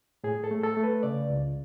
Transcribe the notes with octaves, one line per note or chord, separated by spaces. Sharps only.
A2 G#4
A4
A3
A4
A3
B4
C#3 D5
C#2